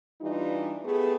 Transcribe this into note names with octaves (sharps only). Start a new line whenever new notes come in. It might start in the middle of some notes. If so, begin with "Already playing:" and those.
E3 G3 D4 D#4 F4
A3 B3 G4 G#4